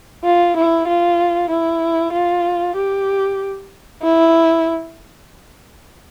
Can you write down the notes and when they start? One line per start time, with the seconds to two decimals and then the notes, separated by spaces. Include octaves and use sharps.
0.24 F4
0.56 E4
0.88 F4
1.50 E4
2.13 F4
2.76 G4
4.03 E4